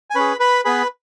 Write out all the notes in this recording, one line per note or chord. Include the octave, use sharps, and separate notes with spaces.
G#5
C#4 G#4 B4 B5
B4 B5
B3 G#4 B4 B5